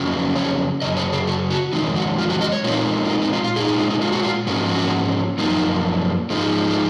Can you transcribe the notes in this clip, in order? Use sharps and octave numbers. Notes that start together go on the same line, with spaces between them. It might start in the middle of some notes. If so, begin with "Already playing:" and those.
Already playing: F2 C#3 F#3 C#4
C#5
F#2 C#3 D#5
C#5
G#4
F#4
F#4
F2 C3 D#3 G#3 D#4
F#4
F4
F#4
D#5
C#5
A#2 G#3 C4 D#4 F4
F4
D#4
D#4
F4
F4
A#2 G#3 D#4 G#4
G#4
F4
D#4
F4
F#4
F4
G#2 F3 A#3 C#4 F#4
F#4
F#2 F3 A#3 D#4
G#2 F3 G#3 D#4
F4